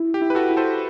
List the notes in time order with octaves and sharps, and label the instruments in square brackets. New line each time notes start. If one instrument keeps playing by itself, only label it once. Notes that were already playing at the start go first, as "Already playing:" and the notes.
Already playing: [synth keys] E4
[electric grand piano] G4
[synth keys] E4
[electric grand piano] B4
F#4 A4
[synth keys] E4
[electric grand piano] A4 C5